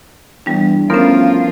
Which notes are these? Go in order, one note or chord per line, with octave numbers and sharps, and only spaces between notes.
E2 G3 D4
A2 F3 B3 C#4 F4 A#4